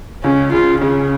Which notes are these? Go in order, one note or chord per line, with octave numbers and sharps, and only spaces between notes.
C#2 C#4
C#3 F4
C#3 C#4